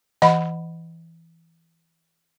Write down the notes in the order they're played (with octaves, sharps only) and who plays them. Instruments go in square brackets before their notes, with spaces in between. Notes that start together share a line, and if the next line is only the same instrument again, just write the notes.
[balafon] E3 D#5 F#5 B5